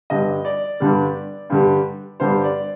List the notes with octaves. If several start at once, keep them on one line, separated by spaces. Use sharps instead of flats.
G2 D3 G3 D#5
D5
G2 D3 G3
G2 D3 G3
G2 D3 G3 C5
D5